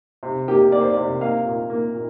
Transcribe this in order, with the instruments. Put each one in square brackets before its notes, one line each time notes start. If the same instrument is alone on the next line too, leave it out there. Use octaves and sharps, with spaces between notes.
[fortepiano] C3
A#3 G4
A#3 D5
C5
D5
C3
A#3 F5
A#2
A#3
A#2